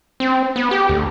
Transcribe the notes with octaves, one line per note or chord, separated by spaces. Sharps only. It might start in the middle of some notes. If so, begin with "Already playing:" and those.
C4
B3
G4
D2